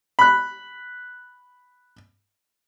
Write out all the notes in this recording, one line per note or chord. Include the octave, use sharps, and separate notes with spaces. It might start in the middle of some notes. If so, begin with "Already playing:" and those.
B5 F#6